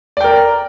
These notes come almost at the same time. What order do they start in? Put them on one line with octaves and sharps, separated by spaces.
D5 G5 A#4 A#5